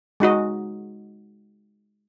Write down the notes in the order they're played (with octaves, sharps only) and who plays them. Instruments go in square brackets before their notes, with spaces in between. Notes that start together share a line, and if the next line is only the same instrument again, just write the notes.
[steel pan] G#3 D#4 F#4 D#5